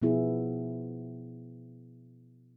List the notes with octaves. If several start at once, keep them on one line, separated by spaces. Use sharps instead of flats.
B2 F3 B3 E4 G#4